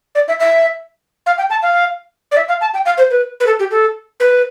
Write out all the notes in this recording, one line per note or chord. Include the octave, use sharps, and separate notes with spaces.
D5
E5
E5
F5
G5
A5
F5
D5
E5
F5
A5
G5
F5
C5
B4
B4
A4
G4
A4
B4